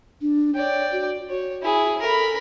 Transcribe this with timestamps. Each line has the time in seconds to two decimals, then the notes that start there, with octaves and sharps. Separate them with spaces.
0.22 D4
0.55 C#5 D5 G5
0.92 F#4
1.30 F#4 C#5
1.62 E4 G#4
2.01 A4 A#4 B5